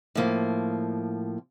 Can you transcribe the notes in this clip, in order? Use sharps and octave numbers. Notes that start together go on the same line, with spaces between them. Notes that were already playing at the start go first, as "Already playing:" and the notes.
A2 F3 A#3